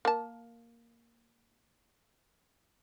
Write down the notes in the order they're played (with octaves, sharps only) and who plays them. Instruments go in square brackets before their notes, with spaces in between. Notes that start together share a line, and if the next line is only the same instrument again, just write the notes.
[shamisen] A#3 A5